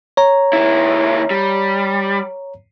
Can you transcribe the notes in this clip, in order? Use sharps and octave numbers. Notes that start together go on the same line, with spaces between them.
C#5 A#5
D#2 E4
G3